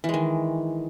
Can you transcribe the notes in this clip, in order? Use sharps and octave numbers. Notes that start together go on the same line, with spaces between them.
D#3 E3 G#3